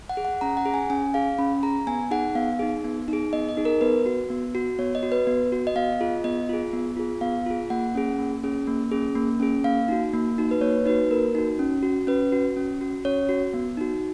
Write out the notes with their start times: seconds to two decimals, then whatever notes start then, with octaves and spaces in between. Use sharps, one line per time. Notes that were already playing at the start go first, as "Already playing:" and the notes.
0.09 F#5
0.17 G#4
0.25 F#5
0.41 C#4 A#5
0.57 F#5
0.66 G#4
0.74 G#5
0.90 C#4 G#5
1.14 G#4 F5
1.39 C#4 B5
1.63 G#4 A#5
1.87 B3 G#5
2.11 D#4 G#4 F#5
2.35 B3 F5
2.59 D#4 G#4
2.84 B3
3.08 D#4
3.13 G#4
3.33 B3 D#5
3.49 D#5
3.57 D#4 G#4
3.65 A#4
3.81 B3 B4
4.06 F#4
4.30 B3
4.55 F#4
4.79 B3 C#5
4.95 D#5
5.03 F#4
5.12 B4
5.27 B3
5.52 F#4
5.67 D#5
5.75 B3 F5
5.93 D#5
6.01 F4 G#4
6.24 B3 D#5
6.49 F4 G#4
6.73 B3
6.97 F4 G#4
7.21 B3 F5
7.46 F4 G#4
7.70 A#3 F#5
7.95 C#4 G#4
8.18 A#3
8.43 C#4 G#4
8.67 A#3
8.92 C#4 G#4
9.15 A#3
9.40 C#4 G#4
9.64 A#3 F5
9.88 D#4 F#4
10.14 A#3
10.38 D#4 F#4
10.51 B4
10.61 A#3 C#5
10.86 D#4 B4
10.89 F#4
11.10 A#3 A#4
11.35 D#4 F#4
11.59 C#4
11.83 F#4
12.07 C#4 B4
12.32 F#4
12.57 C#4
12.81 F#4
13.05 C#4 C#5
13.29 F#4
13.54 B3
13.77 D#4 F#4